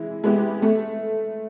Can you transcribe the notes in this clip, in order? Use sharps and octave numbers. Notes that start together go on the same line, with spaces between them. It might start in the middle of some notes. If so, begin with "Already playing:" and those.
Already playing: E3 G#3 E4
G#3 B3 E4 G4
A3